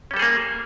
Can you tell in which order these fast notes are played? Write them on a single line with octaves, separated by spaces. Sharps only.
C#4 G3 A4 G#4 A#3